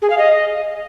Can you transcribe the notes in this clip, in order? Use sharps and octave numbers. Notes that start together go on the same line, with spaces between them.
G#4
F5
D#5